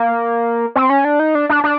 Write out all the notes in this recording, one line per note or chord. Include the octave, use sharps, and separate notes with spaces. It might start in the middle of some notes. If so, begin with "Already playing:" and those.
Already playing: A#3
C4
C#4
D4
D#4
D4
D4
D4